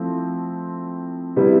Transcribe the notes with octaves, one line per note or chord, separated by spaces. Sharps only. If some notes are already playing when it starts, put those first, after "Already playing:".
Already playing: F3 A3 C4 E4
C3 G3 B3 E4